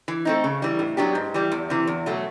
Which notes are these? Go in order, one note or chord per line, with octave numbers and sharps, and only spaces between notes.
E3
A3 C4 D#4
C#3
E3 G3
A2
F#3 B3 D4 G4
G#2
E3 G3
E2
C3 E3
E2
B2 F#3 A3